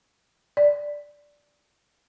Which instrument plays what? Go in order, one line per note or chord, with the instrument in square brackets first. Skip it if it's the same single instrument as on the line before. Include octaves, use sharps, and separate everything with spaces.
[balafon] D5